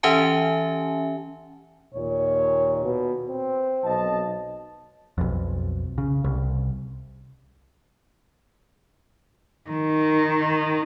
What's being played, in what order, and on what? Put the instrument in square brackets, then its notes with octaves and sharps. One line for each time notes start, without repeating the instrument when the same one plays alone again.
[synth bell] E3 C#4 G4 E5 G#5 A5
[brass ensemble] D#2 A#2 [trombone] C#5
[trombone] B2
C4
[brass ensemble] B1 D#5 A5
[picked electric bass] B1 F2
C#3
C2
[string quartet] D#3